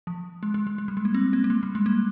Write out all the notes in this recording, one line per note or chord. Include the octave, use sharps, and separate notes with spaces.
F3
G#3
G#3
G#3
G#3
G3
G#3
A#3
C4
A#3
A#3
G#3
G3
G#3
A#3